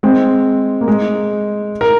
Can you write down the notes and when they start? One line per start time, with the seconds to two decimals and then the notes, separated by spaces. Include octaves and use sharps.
0.03 G#3 C4
0.81 A#3
0.88 G#3
1.81 A#4